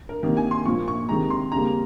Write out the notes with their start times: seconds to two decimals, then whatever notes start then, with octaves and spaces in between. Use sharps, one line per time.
0.09 A#4
0.23 C3 D#3 A#3 A#4
0.37 G#5
0.51 C6
0.66 A#2 F3 A#3 C#6
0.88 C#6
1.09 C3 D#3 G#3 A#5
1.30 C6
1.51 F2 C#3 G3 A#3 A#5